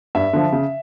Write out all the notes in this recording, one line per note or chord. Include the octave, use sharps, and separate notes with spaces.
G2 E5
D3 F3
C#3